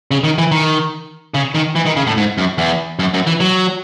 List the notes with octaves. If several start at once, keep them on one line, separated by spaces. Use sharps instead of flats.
C#3
D#3
E3
D#3
C#3
D#3
E3
D#3
C#3
A2
G#2
F#2
E2
F#2
F#2
E3
F#3